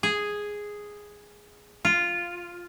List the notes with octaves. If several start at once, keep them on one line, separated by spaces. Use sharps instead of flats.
G#4
F4